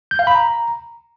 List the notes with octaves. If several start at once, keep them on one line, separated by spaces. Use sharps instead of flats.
G6
F5
B5
A#5